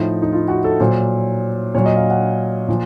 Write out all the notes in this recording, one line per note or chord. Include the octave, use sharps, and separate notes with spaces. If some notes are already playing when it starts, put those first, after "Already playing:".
Already playing: A2 F3 D#4
D#4
F4
F#4
A4
A#2 F#3 C5
A#2 F#3 C#5
D#5
F5
F#5
A#2 F3